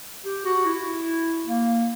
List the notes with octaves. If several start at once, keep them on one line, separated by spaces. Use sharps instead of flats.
G4
F#4
E4
A#3